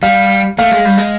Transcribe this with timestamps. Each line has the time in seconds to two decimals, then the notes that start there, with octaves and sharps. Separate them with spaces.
0.03 G3 F5
0.58 A3 F5
0.71 G#3
0.85 G3
0.98 G#3